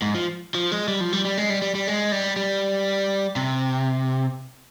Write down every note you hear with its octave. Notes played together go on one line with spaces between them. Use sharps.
G#2
F3
F3
G#3
G3
F3
G3
G3
G#3
G3
G3
G3
G#3
G3
G3
C3